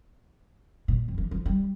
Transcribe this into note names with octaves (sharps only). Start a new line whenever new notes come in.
A#2
F2
E3
F3
G3